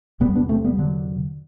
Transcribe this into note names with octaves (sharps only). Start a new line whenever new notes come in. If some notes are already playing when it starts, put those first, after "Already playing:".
E2 C3 G3 B3
B3 D4
A3 C4
G3 B3
D3 F#3